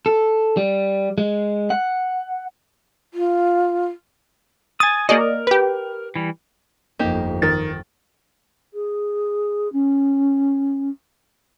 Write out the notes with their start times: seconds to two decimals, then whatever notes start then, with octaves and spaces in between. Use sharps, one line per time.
0.06 A4
0.57 G3
1.18 G#3
1.70 F#5
3.14 F4
4.80 G#5 D#6 A6
5.09 A#3 F#4 G#4 D5 D#5
5.20 A#4
5.47 G4 B4
6.16 E3 G3
6.99 G1 F2 A#3 D#4 G4
7.42 D#3 A6
8.74 G#4
9.73 C#4